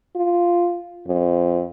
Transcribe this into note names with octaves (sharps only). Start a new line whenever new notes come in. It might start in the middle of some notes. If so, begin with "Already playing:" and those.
F4
F2